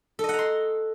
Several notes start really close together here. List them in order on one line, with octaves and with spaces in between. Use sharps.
A4 D#5 F#5 A#5 C6